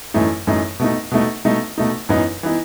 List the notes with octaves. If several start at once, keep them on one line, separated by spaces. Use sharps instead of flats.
F#2 E3 A3 D#4
F#2 E3 A3 D#4
B2 A3 D#4
B2 A3 D#4
B2 A3 D#4
B2 A3 D#4
F#2 E3 B3 D#4
E3 B3 D#4